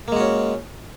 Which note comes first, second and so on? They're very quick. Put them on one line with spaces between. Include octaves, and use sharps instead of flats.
A#3 G#3 F#4 C#4